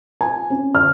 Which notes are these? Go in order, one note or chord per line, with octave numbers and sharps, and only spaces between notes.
G#5
C#4
F6